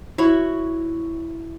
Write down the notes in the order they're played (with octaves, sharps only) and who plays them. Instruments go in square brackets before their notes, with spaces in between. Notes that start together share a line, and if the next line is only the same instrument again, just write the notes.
[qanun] E4 F#4 C#5